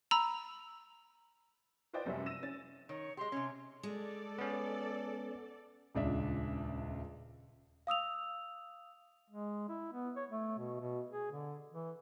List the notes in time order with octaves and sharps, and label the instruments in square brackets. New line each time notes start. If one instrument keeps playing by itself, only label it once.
[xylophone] A#5 B5 E6
[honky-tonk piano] F4 B4 C5 D5 D#5 G5
F1 F#2 G3 C#4 E5
E6 A#6 D#7 E7
C#4 A6
[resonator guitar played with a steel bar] D#3 [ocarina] C#5
[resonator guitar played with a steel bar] G#3 G4 [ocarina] C6
[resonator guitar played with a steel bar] C3 C#4
[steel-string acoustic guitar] G#3 [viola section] A4 D5
[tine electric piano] B3 C#4
[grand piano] D#1 C#2 D4 E5
[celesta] F5 D#6 E6 F7
[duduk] G#3
E4
B3
C#5
A3
B2
B2
G#4
D3
E3